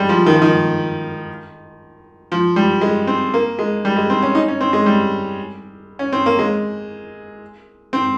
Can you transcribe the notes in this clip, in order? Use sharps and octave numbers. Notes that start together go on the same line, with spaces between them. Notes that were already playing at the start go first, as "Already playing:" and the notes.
Already playing: G3 G#3
F3
D#3
F3
D#3
F3
G3
G#3
C4
A#3
G#3
G3
G#3
C4
C#4
D#4
C#4
C4
G#3
G3
C#4
C4
A#3
G#3
C4